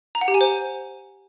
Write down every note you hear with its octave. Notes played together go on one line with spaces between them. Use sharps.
A#5
F#5
G4
G#5
C5